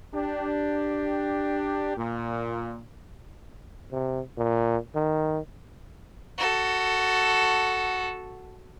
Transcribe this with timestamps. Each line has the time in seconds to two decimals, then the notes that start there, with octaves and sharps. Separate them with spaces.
0.14 D4 G4
1.98 A#2
3.92 C3
4.38 A#2
4.95 D#3
6.38 F#4 A4